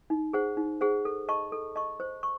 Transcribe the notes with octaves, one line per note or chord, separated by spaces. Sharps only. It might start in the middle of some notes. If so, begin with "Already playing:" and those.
D#4
G#4 C5 F#5
D#4
G#4 C5 F#5
A4
D#5 A5 C#6
A4
D#5 A5 C#6
C5
C#6